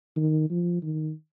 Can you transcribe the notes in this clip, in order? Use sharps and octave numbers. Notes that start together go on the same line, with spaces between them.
D#3
F3
D#3